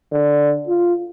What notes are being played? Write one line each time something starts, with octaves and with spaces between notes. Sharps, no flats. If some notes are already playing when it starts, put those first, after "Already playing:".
D3
F4